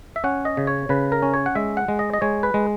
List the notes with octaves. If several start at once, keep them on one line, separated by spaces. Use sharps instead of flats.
E5
C#4 F#5
D#5
C#3
C#5
C#3 B4
A#4
C#4
C#5
F#5
G#3 E5
F#5
G#3
D#5
D#5
G#3 C#5
B4
G#3